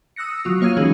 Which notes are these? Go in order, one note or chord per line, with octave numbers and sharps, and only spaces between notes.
D#6 E6 F#6 A#6 C#7
F#3 F4
A#3 C#5 F5 D#6 G#6 D#7
E3 G#3 C#4 D#4 F#4 G#4